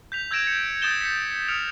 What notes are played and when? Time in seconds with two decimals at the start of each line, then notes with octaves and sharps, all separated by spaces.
0.12 G6 B6 F7
0.31 E6 G6 G#6 A#6 D7 E7
0.44 G#6 C#7
0.82 D#6 G6 A6 E7 G7
1.01 B6 C#7
1.48 D#6 F6 C#7 D7 F7